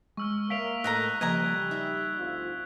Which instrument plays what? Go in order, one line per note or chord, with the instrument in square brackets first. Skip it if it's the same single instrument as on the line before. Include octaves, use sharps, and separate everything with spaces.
[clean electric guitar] G#3 [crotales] C#6 E6 F6
[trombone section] A#3 [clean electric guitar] C#5 E5 F5 [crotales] B6 D7 F7
[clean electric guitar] A2 A4 [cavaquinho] D#5 F5 A#5 [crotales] F#6
[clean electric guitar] C#3 F3 A#3 [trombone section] G3 [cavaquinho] D#5 G#5 A#5 [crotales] G#6
[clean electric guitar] D#4 [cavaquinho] E5
[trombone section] D2 C4 F4